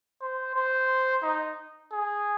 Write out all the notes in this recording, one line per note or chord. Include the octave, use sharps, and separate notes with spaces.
C5
C5
D#4
G#4